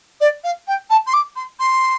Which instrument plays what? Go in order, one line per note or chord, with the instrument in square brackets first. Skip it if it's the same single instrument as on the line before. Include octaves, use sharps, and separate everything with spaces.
[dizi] D5
F5
G5
A5
C6
D6
C6
C6